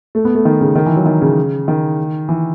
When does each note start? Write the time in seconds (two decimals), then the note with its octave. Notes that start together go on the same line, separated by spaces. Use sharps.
0.15 A3
0.25 B3
0.35 A3
0.45 D#3
0.61 C#3
0.76 D#3
0.86 E3
0.96 F#3
1.06 D#3
1.22 C#3
1.68 D#3
2.29 E3